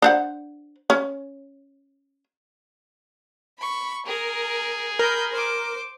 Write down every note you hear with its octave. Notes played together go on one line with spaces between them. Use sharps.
D4 C5 F#5
C#4
B5 C#6
G#4 A#4
A#4 B5 G6
C5 D6